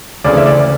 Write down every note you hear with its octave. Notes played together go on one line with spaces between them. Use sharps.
D2 C#3 E3 D5
E5
D5